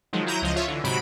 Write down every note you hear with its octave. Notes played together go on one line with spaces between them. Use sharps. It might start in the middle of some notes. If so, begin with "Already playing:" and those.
D#3 F3 F#3 G#3
F#3 E4 A#5 G6 D#7
C#2 F3 D#5
F4 C#5 E5
D3 E3
G#2 C3 F#3 B5 D7